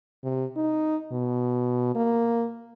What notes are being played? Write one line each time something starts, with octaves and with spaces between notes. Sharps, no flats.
C3
D#4
B2
A#3